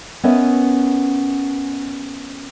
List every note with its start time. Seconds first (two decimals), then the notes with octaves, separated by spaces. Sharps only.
0.24 B3 C#4 A#4 D#5 E5